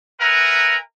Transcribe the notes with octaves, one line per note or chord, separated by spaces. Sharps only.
A#4 B4 E5 F#5 G#5 A#5